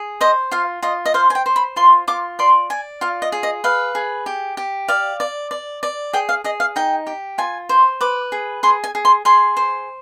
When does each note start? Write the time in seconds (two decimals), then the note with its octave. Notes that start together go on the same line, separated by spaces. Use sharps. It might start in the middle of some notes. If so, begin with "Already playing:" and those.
Already playing: G#4
0.21 C5 D#5
0.51 F4 F5
0.82 F4 D#5
1.06 D#5
1.14 C5 F5
1.30 G#5
1.35 G5
1.46 C5
1.56 B5
1.76 F4 C6
2.08 F4 D6
2.39 D5 C6
2.70 D5 G#5
3.01 F4 F5
3.22 D#5
3.32 G#4
3.43 D#5
3.64 B4 F5
3.95 G#4
4.26 G4
4.57 G4
4.88 D5 F5
5.20 D5
5.51 D5
5.83 D5
6.13 G#4 G5
6.29 F5
6.44 G#4 D#5
6.60 F5
6.76 D#4 G5
7.07 G4
7.38 F4 G#5
7.69 C5
8.01 B4 D6
8.32 G#4
8.63 G#4 C6
8.84 G#5
8.95 G#4
9.05 C6
9.25 G#4 C6
9.57 C5